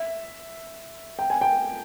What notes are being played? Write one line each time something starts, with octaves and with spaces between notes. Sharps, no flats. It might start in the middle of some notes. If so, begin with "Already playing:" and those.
Already playing: E5
G5
G#5
G5